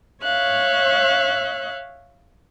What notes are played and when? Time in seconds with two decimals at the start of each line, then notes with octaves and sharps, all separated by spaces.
0.23 C#5 E5 F5 F#6